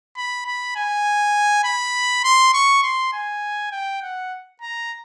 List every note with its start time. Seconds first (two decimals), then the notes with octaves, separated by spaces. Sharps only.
0.17 B5
0.46 B5
0.76 G#5
1.64 B5
2.24 C6
2.54 C#6
2.83 C6
3.13 G#5
3.71 G5
4.02 F#5
4.61 A#5